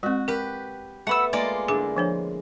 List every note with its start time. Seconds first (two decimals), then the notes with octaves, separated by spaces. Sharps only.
0.03 G#3 C4 F#4
0.28 G4 A#4 B4
1.07 A3 B3 F#5 B5 E6
1.33 G#3 A#3 F4 D5
1.68 D3 E4 G#4 G#5 D6
1.97 F3 D4 C#5